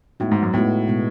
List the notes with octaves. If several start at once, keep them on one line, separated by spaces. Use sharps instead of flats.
A2 G#3 B3 D#4 F#4
G#2
F#2
A2 G#3 B3 D#4 F#4
B2 G#3 B3